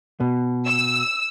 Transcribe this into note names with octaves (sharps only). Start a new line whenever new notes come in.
B2
E6